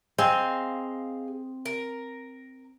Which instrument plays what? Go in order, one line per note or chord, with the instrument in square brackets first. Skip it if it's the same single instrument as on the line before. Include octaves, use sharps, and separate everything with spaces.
[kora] C4 [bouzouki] G#4 D#5 F5
[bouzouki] A#4